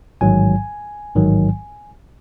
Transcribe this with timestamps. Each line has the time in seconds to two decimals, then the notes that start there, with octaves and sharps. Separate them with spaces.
0.21 A1 G#2 D#3 F#3 G#5
1.15 A1 G#2 D#3 F#3